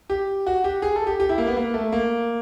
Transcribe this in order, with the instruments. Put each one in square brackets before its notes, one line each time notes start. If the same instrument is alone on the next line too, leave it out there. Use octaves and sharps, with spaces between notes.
[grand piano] G4
F#4
G4
G#4
A4
G4
G4
E4
A#3
B3
A#3
A3
A#3